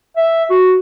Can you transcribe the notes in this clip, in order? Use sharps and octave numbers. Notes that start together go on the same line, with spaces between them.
E5
F#4